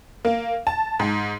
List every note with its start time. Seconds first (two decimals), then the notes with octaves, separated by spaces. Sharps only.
0.25 A#3
0.67 A5
1.00 G#2